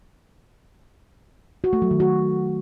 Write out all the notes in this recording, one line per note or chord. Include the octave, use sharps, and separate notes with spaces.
F#4
A3
F#3
D#3
F#4